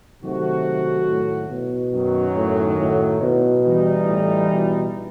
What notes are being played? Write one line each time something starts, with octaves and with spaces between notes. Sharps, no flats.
C3 D#3 F#3 A3 D#4 F#4
A2
B2
F#2 D#3 F#3
A2
A2
B2
E3 G3 D#4
A2
B2